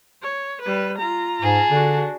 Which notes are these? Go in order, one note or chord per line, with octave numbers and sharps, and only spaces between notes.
C#5
G3 B4
F4 A#5
G#2 G#4 A5
D3 D4 F#4